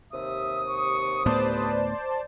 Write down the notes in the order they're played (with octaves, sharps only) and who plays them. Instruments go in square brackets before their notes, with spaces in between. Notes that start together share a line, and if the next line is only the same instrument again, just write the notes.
[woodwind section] D#2 C3 D#6 [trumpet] E5
[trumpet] C#6
[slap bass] D2 A2 B3 [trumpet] B4 [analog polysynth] C5 D5 A5